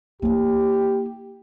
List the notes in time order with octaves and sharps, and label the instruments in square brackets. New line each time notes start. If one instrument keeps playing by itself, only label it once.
[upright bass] A#3 E4 [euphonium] G4